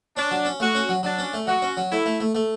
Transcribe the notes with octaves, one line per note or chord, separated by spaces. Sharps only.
C#4 D4
F#3
C#4
A3 F#4
C#4
F#3
F#3 D4
C#4
A3
F#3 F#4
C#4
F#3
A3 E4
A3
A3
A3